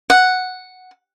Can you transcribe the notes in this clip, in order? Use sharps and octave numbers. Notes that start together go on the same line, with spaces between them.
F#5